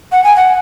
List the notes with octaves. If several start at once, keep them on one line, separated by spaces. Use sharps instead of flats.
F#5
G#5
F#5